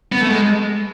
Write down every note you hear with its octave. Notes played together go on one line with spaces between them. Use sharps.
B3
A3
G#3